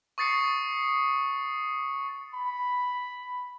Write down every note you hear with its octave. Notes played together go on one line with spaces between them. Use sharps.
C#6 D#6 A6 C7 C#7
B5